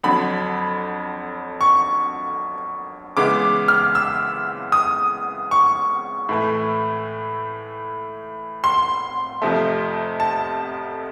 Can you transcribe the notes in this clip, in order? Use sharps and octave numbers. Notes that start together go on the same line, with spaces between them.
F2 D3 F#3 B5
C#6
C#3 E3 G#3 B3 D6
F6
E6
D#6
C#6
A2 E3 A3
C6
F2 C3 F3 A3
A5